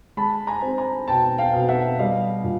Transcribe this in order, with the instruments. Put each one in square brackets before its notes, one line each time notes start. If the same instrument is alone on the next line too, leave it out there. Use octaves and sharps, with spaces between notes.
[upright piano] G#3 A5 B5
G#5 A#5
C4
G#5 A#5
B2 G5 A5
F5 G5
B2
E5 F#5
G3 D#5 F5
A#2